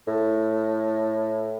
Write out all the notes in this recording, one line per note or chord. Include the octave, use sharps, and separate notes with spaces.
A2